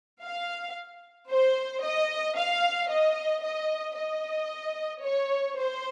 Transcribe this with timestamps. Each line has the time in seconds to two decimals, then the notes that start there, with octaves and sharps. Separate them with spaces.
0.23 F5
1.31 C5
1.83 D#5
2.37 F5
2.90 D#5
3.44 D#5
3.96 D#5
5.04 C#5
5.58 C5